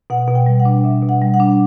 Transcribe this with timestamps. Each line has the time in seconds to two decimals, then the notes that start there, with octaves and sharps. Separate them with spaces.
0.10 B2 F#5
0.28 B2
0.35 G5
0.46 G3
0.60 F#5
0.65 D4
0.84 B2 E5
1.03 B2
1.09 F#5
1.21 G3
1.34 F#5
1.40 D4